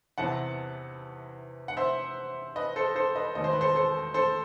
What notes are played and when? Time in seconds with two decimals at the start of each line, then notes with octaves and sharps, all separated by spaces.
0.18 E2 C3 E3 B3 F#5 A5
1.68 F#5
1.77 C5 E5
2.56 B4 D#5
2.76 A4 C5
2.95 A4 C5
3.15 B4 D#5
3.35 E1 D#2 D#3 A3 D#4 D#5
3.44 C5
3.52 B4
3.61 A4 C5
3.75 A4 C5
4.14 A4 C5